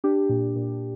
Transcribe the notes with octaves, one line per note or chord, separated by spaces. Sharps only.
D4 G4
A#2
A#2